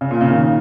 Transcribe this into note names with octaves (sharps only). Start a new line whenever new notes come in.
C#3
A#2
C#3
D#3
C#3